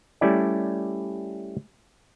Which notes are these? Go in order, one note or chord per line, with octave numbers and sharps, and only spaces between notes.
G3 A3 C#4 E4 D5